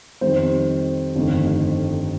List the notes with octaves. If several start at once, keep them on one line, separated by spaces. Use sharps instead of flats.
F2 D#3 G3 C5
G1 F2 D#3 A3